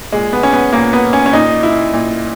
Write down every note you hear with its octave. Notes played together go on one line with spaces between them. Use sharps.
A#2 G#3
B3
C#4
B3
A#2 A#3
B3
C#4
C#4
A#2 D#4
E4
A#2